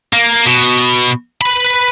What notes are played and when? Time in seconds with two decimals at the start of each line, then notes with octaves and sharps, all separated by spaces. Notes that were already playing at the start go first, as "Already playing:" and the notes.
0.13 A#3
0.46 B2
1.41 B4 B5